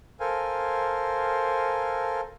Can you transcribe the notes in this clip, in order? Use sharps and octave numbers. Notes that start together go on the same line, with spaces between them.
A4 A#4 C5 F5 G#5